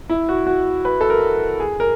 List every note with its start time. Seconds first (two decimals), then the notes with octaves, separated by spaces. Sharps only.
0.09 E4
0.29 F#4
0.47 F#4
0.85 B4
1.01 A4
1.10 A#4
1.60 G#4
1.80 A#4